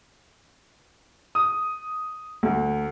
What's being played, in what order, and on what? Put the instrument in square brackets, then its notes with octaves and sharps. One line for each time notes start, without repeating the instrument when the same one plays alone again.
[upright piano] D#6
D2